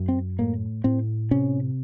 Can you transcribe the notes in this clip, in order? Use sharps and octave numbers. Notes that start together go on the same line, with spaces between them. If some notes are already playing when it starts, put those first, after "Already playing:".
Already playing: F#2
C4
A2 A#3
A2 C4
C3 C#4